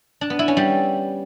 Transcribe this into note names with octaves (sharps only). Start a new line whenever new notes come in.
D4
B3
E4
C#4
G3